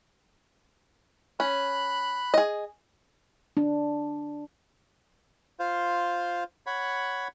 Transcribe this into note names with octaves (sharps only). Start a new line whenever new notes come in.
C#4 B5 F#6
G#4 D#5
D4
F4 C5 F5
C#5 F#5 B5